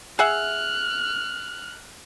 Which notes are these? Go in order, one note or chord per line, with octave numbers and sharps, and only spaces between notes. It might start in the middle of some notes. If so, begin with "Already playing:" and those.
G#4 E5 F#5 F6 F#6